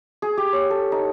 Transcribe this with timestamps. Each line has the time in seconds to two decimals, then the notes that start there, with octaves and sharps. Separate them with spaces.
0.22 G#4
0.37 G4
0.53 C#5
0.70 A4
0.92 D#4